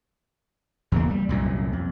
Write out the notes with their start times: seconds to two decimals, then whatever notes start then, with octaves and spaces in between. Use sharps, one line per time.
0.92 E2 C#3 A#3
1.10 G3
1.29 C2 F#2 A#2
1.73 F2